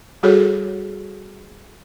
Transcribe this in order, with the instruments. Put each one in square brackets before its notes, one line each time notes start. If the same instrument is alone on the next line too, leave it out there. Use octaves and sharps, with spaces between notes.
[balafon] G3 F#4 G#4 A4 C#5